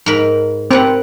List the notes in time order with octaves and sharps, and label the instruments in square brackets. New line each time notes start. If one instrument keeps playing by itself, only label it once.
[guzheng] G#2 A#4 B5
[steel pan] C4 [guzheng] A#4 B4 F#5